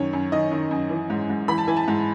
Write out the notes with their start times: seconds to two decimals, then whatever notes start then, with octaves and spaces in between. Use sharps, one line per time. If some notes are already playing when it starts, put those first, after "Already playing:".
Already playing: F#2 D#3 C#5
0.13 F#2
0.32 D#3 D#5
0.52 D#3
0.71 F#2
0.90 E3
1.10 G#2
1.30 G#2
1.48 E3 B5
1.58 A5
1.68 E3 G#5
1.77 A5
1.88 G#2